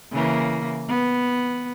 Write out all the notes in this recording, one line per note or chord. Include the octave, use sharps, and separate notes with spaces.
C#3 E3 A#3
B3